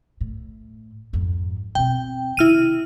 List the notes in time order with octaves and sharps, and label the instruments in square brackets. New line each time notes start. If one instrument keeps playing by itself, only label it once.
[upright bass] A2
F2 G#2
[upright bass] B2 C4 [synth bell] G5
[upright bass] C3 D#3 [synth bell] E4 F6 D#7